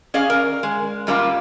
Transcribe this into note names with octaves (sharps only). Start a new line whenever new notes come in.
C#4 G#4 D5 F5
A#4
G#3
F#2 G3 A#3 F4